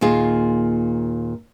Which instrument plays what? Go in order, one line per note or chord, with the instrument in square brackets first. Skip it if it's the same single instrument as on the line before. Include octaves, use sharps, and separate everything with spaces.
[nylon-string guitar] D#2 A#2 F4 G#4